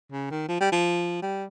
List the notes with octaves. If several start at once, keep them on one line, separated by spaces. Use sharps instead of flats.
C#3
D#3
F3
G3
F3
G3